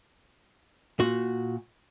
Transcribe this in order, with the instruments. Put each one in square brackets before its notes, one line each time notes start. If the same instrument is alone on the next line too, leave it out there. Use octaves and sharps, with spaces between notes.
[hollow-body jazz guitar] A#2 F#4